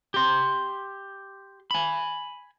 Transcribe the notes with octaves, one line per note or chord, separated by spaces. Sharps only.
G4 C6
G#5 B5